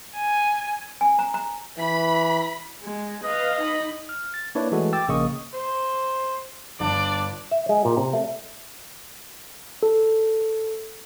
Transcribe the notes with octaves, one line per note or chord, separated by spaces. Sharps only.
G#5
G#5
A#5
A#5
E3 B5
G#3
B4 D#5 F5
D#4 B5
F6
A6
A#3 D4 E4 B4 C#5 D5
E3 G#3 A3 F#4 A4
G5 D6 E6 A6
A#1 C#3 A#3 D#5 C#6 D#6
C5
G1 D4 D5
E5
G#3
A#2
C3
A3
A4